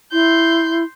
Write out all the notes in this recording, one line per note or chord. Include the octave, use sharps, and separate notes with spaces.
E4 C6 G6